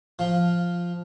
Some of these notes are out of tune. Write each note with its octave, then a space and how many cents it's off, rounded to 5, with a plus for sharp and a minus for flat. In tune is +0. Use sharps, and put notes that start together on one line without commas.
F3 +0 F4 +0